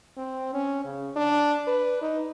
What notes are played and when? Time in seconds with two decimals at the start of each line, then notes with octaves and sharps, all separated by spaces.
0.17 C4
0.54 C#4
0.85 C#3
1.16 D4
1.67 B4
2.02 D#4